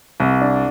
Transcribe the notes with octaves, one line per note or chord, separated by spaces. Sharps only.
C2
D4